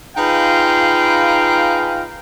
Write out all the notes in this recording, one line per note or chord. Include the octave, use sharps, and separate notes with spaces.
D#4 F4 G#4 B4 F5 G5